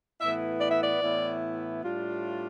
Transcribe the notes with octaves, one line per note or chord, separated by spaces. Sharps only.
A2 E3 B3 E4 E5
D5
E5
D5
A2 E3 B3 E4
A2 G3 D4 F4